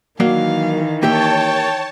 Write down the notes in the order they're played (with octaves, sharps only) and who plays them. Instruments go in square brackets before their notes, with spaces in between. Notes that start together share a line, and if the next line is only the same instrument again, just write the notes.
[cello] D#3 E3 [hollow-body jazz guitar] F#3 A#3 D5 [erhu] F5
[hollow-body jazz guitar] A#3 G4 E5 [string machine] C#5 A5 [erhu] G5